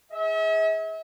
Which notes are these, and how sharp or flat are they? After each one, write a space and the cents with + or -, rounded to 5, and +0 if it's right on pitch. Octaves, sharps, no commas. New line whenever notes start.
G#4 +0 E5 -40